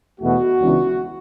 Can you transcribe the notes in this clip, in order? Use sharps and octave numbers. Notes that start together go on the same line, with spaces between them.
E2 B2 A3 F#4
C#2 C#3 E3 B3 D4